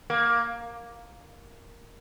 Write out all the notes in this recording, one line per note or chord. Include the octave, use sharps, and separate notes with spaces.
A#3